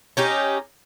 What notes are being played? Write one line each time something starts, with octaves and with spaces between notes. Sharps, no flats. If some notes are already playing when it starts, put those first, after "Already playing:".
C#4 D#4 G4